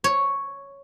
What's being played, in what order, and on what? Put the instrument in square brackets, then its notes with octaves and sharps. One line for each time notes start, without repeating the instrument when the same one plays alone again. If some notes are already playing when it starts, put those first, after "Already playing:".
[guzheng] C#5